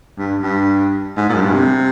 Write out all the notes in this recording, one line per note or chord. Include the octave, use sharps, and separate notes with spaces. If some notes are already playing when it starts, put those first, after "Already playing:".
G2
G2
G#2
A#2
F#2
G2
C3